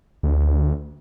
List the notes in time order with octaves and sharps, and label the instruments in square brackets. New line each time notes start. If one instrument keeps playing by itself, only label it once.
[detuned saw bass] D2